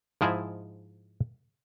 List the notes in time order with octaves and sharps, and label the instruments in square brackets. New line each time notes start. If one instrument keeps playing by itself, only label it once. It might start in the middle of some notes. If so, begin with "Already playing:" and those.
[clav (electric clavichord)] G#2 F3 E4 G#4 D#5 E5